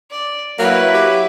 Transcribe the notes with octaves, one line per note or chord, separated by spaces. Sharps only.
D5
F#3 A#3 E4 B4
G4